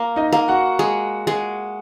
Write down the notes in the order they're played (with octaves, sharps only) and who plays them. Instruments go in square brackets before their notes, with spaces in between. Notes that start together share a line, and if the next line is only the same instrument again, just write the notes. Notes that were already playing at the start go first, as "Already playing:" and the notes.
Already playing: [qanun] A#3
[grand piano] D#4 D#5
[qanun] A#3
[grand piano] F#4 F#5
[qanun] G#3
G#3